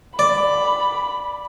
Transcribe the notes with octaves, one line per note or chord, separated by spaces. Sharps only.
D5 B5